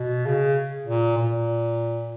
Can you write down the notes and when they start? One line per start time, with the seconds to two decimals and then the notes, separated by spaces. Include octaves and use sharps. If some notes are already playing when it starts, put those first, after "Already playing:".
Already playing: B2
0.26 C#3
0.86 A#2
1.17 A#2